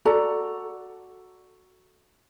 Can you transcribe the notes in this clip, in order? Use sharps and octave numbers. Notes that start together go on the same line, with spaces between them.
F#4 A4 D5 A#5